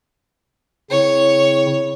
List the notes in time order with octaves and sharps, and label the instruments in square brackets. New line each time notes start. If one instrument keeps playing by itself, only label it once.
[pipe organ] C#3 C4 E4 [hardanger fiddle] C#5